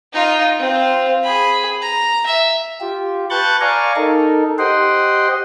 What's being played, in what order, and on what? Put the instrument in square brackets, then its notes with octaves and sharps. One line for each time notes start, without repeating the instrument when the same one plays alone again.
[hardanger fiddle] D#4 F4
C4 F4
G#4 B5
A#5
E5
[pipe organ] F4 G4
B4 A5 C#6 F#6 G6 A6
D5 F5 G#5 A#5 C#6
D#4 A4 A#4
G4 C5 D#5 F#5 G5 C6